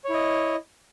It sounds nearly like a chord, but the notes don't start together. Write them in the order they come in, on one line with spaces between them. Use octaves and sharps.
C#5 E4 D#5